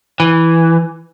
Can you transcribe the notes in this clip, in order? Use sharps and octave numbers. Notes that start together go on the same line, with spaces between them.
E3